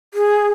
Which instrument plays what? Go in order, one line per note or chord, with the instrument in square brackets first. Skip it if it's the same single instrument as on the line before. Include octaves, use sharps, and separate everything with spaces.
[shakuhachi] G#4